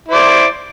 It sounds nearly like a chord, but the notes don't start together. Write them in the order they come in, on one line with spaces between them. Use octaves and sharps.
E4 C5 D5